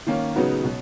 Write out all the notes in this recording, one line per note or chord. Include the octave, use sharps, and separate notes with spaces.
D#3 A#3 C#4
C#3 F#3 B3 D#4 F#4
B2 F#3